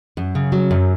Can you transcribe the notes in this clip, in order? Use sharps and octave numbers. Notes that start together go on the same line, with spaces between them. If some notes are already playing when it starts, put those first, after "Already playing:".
F#2
C#3
F#3
F#2